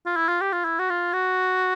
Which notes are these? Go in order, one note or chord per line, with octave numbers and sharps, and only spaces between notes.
F4
E4
F4
G4
F4
E4
F#4
F4
F#4